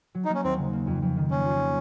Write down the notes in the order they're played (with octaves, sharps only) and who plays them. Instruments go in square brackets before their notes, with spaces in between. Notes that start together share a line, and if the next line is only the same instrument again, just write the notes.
[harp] F#3
[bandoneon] D#4
[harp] A#3
[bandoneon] C#4
[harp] D#2 [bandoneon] C4
[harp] C#3
A#3
F2
F2
D#3
[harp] A#3 [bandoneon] C#4
[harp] F4